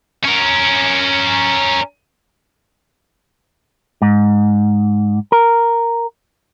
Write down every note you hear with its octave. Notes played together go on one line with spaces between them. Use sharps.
C#4 A#4
G#2
A#4